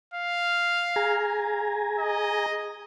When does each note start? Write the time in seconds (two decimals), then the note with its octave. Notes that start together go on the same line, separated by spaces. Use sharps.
0.14 F5
0.96 G#4 G#5 A#5
1.99 D#5